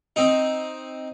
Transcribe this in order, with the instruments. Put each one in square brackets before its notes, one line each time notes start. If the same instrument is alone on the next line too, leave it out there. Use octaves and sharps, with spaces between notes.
[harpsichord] C4 D#4